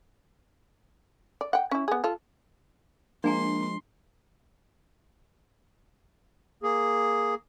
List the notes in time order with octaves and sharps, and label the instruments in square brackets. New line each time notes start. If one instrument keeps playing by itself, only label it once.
[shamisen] D5
F#5 G5
C#4 E4
B3 G#4
F4 A4
[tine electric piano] F3 G#3 [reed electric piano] A#3 [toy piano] D4 G#5 A#5 [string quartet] C6
[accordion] A#3 G#4